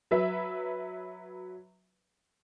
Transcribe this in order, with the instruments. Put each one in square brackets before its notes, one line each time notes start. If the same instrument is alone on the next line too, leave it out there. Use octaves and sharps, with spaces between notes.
[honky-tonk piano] F#3 B4 E5